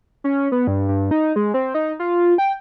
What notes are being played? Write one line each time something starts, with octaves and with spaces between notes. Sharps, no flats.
C#4
B3
G2
G2
D#4
G#3
C4
D#4
F4
G5